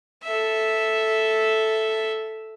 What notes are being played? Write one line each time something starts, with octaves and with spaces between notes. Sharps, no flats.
A4 E5